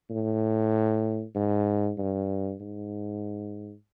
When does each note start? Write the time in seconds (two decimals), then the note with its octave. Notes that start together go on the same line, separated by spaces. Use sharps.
0.10 A2
1.36 G#2
1.98 G2
2.61 G#2